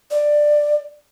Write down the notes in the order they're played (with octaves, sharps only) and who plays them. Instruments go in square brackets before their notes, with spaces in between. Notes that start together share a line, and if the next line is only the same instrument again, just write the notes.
[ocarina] D5